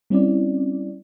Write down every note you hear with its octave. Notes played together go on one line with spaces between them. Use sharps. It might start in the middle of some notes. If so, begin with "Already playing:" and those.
G3 C4 C#4 E4 D5